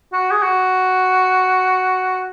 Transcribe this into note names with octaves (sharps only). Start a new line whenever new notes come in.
F#4
G#4
F#4